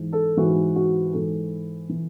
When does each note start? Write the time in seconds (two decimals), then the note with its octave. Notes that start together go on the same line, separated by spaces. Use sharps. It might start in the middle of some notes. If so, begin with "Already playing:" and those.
Already playing: G#2 E3
0.13 A4
0.37 G#2 E3 F#4
0.76 F#4
1.13 G#2 E3 A4
1.89 E3